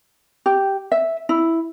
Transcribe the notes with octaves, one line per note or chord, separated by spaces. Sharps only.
G4
E5
E4